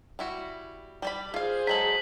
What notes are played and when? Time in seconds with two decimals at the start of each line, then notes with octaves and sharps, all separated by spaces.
0.19 G3 E4 F#4
1.02 G3 D5 B5
1.34 F4 G#4 C5 F5
1.67 F#3 G#3 A4 B6 F#7